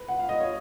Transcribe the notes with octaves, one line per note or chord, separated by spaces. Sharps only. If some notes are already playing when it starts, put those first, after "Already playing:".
Already playing: B4
F#5
F5
D#5
C#5